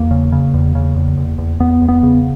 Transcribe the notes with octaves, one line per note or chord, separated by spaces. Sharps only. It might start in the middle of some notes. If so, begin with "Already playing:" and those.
Already playing: E2 A#3
C#3
C#3
E2
C#3
E2
E2
E2
E2 B3
E2
B3
C#3